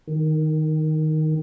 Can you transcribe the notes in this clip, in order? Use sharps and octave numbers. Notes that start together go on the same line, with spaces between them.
D#3